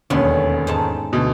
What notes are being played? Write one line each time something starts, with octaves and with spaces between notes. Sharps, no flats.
E1 D#2 D3 B3 C#4
G#2 D#4 A5
D2 B2